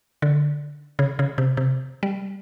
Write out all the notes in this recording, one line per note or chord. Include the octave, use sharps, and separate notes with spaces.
D3
C#3
C#3
C3
C3
G3